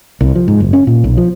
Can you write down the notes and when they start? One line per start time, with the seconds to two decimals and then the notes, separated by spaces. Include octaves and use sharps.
0.21 C2
0.35 F3
0.48 G#2
0.60 F#1
0.73 C#4
0.87 A#2
1.04 B1
1.17 F3